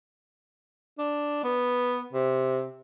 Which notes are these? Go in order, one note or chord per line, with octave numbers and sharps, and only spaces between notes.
D4
B3
C3